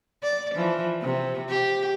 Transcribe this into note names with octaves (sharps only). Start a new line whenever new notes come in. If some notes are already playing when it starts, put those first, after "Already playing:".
D5
E3 F3
C3
G4